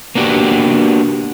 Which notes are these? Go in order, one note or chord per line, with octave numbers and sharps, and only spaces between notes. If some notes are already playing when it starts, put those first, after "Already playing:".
A#3 B3 D4 F#4 G4